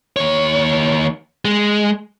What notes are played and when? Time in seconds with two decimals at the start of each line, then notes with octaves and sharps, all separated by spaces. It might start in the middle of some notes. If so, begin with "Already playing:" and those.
0.16 D#2 C#5
1.45 G#3